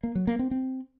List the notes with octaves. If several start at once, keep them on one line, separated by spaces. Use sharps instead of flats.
A#3
F#3
A#3
C4
C4